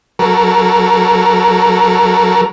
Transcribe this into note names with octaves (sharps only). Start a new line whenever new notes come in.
F#3 A4 A#4